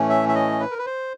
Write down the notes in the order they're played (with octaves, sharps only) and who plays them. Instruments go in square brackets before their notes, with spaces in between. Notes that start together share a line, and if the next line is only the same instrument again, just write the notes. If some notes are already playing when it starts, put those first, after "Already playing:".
Already playing: [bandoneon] A2 E3 A3 C#4
E5
E5
D#5
B4
A#4
B4
C5